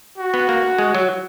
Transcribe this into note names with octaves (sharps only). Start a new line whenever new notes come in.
F#4
B3
A#3
G#3
F#3